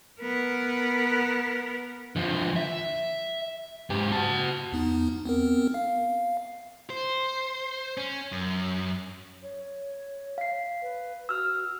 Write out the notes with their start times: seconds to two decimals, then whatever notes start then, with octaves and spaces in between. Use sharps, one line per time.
0.21 B3 A#4
2.16 D3 F3
2.56 E5
3.90 G#2 G4
4.12 F#4 A5
4.73 E2 B3 D#4
5.26 B3 C4 A#4
5.74 F5
6.90 C5
7.97 C#4
8.32 F#2
9.42 C#5
10.38 F5 C7
10.82 B4
11.29 F#4 E6 F6